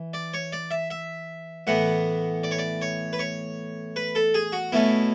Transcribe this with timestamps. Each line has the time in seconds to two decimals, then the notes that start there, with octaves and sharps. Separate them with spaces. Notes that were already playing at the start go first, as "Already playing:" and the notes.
Already playing: E3
0.14 D5
0.34 C#5
0.53 D5
0.71 E5
0.90 E5
1.67 A2 E3 B3 F#5
2.44 D5
2.51 C#5
2.59 D5
2.82 C#5
3.13 B4
3.19 C#5
3.96 B4
4.15 A4
4.34 G#4
4.52 F#4
4.72 B2 A3 C#4 E4